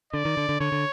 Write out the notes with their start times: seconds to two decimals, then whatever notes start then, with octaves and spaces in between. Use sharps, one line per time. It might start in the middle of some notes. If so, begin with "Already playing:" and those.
0.13 D3 D5
0.25 D#3
0.37 D3
0.49 D3
0.60 D3 C#5
0.72 D3